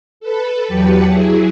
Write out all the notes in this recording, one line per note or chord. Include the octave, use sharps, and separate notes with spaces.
A4 B4
E2 F#3 G4 B4 A5 C#7
F#3 E4 G#4